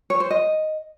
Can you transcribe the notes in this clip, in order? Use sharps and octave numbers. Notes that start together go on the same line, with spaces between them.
C#5
C5
D#5